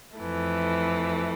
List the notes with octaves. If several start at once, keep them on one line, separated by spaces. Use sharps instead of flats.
F2 E3 A3